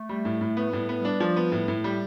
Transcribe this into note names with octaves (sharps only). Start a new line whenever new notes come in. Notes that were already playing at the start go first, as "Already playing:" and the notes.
Already playing: A3
G3
A2
A2
A3 B3
A2 G3
B3
G3
D4
F3
B3
A2 G3
A2
A3
G3